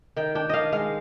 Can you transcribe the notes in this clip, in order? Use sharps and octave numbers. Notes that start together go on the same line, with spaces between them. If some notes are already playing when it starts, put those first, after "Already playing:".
D#3 G5
D4 G5
D#3 D#5 F5
G#3 F5